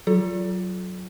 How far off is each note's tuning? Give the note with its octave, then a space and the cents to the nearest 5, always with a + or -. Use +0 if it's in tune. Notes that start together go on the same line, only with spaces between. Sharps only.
F#3 +0 F4 +0 A4 -30